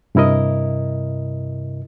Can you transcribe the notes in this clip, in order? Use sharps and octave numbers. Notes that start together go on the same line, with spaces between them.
G2 C3 E4 A#4 D#5